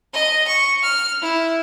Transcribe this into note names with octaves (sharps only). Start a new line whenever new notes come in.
D#5
C#6
F6
E4